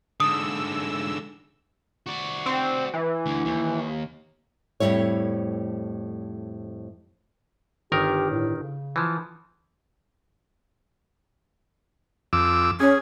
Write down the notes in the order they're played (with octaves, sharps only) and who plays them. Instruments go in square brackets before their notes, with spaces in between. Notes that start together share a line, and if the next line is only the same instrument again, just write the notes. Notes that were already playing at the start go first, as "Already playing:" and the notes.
[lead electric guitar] G#2 D3 [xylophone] D#6 [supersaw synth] E6
[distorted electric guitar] F#4 D5
[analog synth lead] C4
E3
[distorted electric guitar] D2
D#2
[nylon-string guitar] F2 A2 D#3 G3 E4 C#5
[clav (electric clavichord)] G1 D#3 A#4 [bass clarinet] G4
[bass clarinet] A2
C#3
[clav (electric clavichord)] E3 F3
[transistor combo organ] F2 D6 E6
[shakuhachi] C#4 [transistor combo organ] G#4